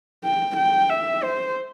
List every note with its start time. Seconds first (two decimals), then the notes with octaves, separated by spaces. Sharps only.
0.24 G5
0.57 G5
0.90 E5
1.23 C5